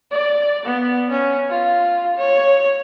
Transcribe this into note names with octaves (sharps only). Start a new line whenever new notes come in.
D5
B3
C#4
F4
C#5